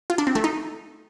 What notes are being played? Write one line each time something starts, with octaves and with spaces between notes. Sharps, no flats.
F4
D4
C4
A3
D#4